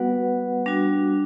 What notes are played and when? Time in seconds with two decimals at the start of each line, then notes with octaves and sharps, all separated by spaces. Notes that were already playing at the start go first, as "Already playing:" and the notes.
Already playing: G3 B3 F#4 B4 F#5
0.66 G3 D4 F#4